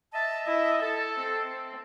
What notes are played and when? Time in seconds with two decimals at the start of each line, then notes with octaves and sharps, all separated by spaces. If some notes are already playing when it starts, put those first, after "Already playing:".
0.14 D#5 E5 A5
0.46 E4 D#5 E5
0.82 A4 A5
1.17 C4